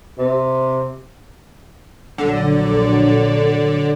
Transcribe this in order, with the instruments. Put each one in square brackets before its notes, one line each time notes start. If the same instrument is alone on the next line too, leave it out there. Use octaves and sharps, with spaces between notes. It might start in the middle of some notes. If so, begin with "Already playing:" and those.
[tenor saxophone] C3
[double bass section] A#1 F#3 [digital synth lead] D3